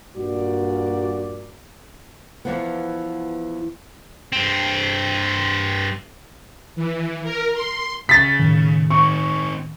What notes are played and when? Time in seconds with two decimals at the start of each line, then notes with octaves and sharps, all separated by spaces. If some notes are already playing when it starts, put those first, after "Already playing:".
0.16 G2 A#2 F#4 D5
2.45 E2 E3 F3 B3
4.33 G2 C4
6.76 E3
7.23 A#4
7.54 C6
8.09 C#3 A6 B6
8.39 A2 D#3
8.90 C4 D#4 C#6